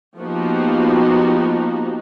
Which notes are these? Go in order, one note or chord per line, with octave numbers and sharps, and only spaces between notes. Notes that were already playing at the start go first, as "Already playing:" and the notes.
F3 A#3 B3 D#4 F#4 G4